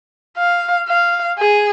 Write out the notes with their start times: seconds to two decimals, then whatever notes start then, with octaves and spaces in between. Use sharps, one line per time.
0.38 F5
0.88 F5
1.39 G#4